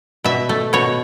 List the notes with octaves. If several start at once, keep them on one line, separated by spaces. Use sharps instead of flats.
B2 E5
A3
B2 C#5